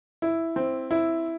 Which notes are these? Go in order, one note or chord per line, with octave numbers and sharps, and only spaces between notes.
E4
C4
E4